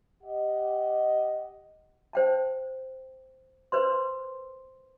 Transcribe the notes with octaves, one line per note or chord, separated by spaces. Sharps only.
G4 D#5 F#5
C5 G5 A5
B4 C5 C6